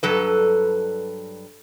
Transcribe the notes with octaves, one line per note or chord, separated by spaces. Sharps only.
G2 F#3 A4 B4